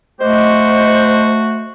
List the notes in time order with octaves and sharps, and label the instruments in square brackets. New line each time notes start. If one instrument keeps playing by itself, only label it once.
[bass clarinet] A3 [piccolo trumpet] F#4 [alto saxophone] C5 [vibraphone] D#5 D6